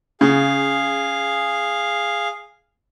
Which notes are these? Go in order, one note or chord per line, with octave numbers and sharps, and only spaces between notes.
C#3 G#4 F5